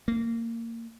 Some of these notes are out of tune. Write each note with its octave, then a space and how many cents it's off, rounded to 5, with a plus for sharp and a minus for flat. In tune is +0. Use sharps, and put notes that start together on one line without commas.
A#3 -20